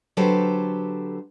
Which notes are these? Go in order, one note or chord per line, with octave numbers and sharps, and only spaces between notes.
D3 F#3 G4 A4 B4 C5